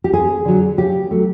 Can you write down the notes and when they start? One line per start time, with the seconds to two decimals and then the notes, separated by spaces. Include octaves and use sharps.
0.04 G4
0.13 F2 G#4
0.45 D3 F#3
0.77 C#3 G4
1.11 F#3 A3